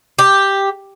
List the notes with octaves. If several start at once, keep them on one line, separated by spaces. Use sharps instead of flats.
G4